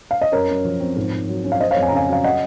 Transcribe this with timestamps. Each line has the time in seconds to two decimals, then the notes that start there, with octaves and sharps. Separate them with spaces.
0.11 F5
0.22 D#5
0.32 F#2 A#4 C#5
0.49 F#2
0.65 F3
0.80 C4
0.96 G#2
1.13 G#2
1.28 F#3
1.44 C#4
1.52 F5
1.60 C#4 C5 D#5
1.71 C#5 F5
1.76 F2
1.82 G#5
1.88 A#5
1.92 C#3 F5 G#5
2.08 F#3 F5
2.24 C#4 D#5 F#5